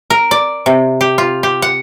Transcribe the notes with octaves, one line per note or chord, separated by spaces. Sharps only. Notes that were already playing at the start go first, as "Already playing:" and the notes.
A#4
D5
C3
G4
F4
G4
F#5